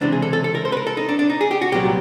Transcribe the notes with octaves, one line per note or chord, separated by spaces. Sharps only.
C#2 C3 E3 G#3 C4 D4
G#4
A4
A4
A4
A#4
C5
B4
A#4
A4
D#4
D4
D4
D#4
G#4
G4
F#4
C2 A#2 F#3 B3 G4